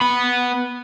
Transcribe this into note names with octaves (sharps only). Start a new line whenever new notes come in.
B3 B5